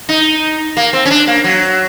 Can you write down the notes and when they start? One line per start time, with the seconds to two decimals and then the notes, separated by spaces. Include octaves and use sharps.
0.09 D#4
0.77 A#3
0.93 C4
1.06 C#4
1.11 D4
1.27 A#3
1.44 F#3